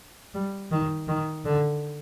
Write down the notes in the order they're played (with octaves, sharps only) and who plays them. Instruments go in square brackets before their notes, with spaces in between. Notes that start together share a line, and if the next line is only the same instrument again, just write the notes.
[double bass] G3
D#3
D#3
D3